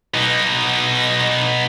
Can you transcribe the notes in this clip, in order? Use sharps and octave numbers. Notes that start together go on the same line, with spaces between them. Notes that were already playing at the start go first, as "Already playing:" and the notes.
B2 D#4